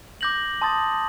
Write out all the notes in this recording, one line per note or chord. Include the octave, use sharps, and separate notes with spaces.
D6 G6 A#6 F#7
A5 C6 D#6 A6